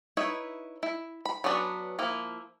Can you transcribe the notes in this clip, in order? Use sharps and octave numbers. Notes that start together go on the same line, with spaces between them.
D#4 E4 B4 C#5 E5
E4
B5
F#3 B3 C#4 D4 B4
F3 A#3 E4